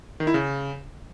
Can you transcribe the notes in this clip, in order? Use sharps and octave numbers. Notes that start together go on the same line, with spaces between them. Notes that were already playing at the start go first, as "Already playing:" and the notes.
D#3
E4
C#3